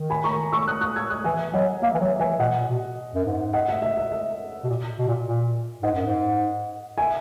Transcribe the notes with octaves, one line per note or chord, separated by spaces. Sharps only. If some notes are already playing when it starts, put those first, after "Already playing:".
Already playing: D#3
G#5 B5
A#5 C#6
C#6 E6
D#6 F#6
D#6 F#6
E6 G#6
D#6 F#6
E3 E5 G#5
F#3 D#5 F#5
A#3 E5
E3
F#3 E5
E3 E5 G#5
A#2 D#5 F#5
A#2
B2
F#2
G#2
D#5 F#5
E5
E5
E5
E5
B2
A#2
B2
A#2
A#2
G#2 D#5 F#5
F#2
G#2
E5 G#5